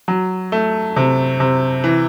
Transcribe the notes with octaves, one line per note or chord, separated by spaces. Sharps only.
F#3
A3
C3
C3
E3